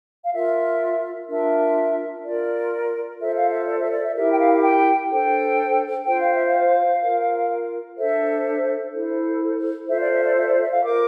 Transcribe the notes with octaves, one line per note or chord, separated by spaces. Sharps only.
F5
F4 A#4 E5
D4 F4 A#4 E5
F4 A#4 D5
F4 A4 C5 E5
F5
E5
D5
E5
D5
E5
E4 G4 A#4 E5
G5
F5
F5
G5
D4 A4 C5 G5
F4 C5 G5
F5
E5
F5
F4 A#4
D4 A4 C5 E5
E4 A4 C5
F4 A4 C5 E5
D5
E5
D5
E5
D5
E5
F5
F4 A#4 D6